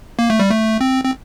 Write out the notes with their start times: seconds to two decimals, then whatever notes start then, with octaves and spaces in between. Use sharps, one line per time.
0.19 A#3
0.30 A3
0.40 G3
0.51 A3
0.81 C4
1.04 C4